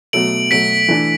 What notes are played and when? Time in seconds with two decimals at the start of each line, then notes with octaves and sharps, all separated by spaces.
0.13 B2 F#3 A3 D7 F#7
0.51 B2 F#3 A3 B6 D7
0.89 E3 A3 D4